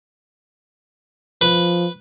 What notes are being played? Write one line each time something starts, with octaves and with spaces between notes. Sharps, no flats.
F3 B4